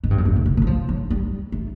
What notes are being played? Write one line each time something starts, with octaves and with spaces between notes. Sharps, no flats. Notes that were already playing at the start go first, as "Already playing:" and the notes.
G#2
G2
F#2
F2
B2
C3
C#3
F#3
F3
F#3
G3
A3